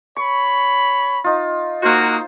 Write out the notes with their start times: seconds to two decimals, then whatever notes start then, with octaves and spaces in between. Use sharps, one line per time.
0.17 C#5 B5 C#6
1.24 D#4 F4
1.83 A#3 D#4 F#4 C5